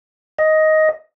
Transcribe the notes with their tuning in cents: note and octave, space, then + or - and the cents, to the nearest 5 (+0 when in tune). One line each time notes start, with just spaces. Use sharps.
D#5 +10